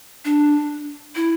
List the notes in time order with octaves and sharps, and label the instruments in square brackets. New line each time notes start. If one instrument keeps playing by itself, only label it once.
[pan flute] D4
E4